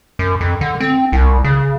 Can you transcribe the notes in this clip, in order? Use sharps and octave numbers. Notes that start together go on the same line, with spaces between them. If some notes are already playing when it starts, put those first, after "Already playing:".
F#2
F2
D3
C4
C2
C#3